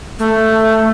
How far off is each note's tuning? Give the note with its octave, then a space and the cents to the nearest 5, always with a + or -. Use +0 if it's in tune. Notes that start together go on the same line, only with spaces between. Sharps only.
A3 +5